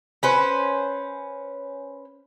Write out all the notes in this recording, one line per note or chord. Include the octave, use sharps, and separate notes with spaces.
C#4 B4 C5